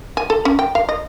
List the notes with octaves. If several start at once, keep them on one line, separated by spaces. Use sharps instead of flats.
G#5
A4
C#4
G5
F5
D#5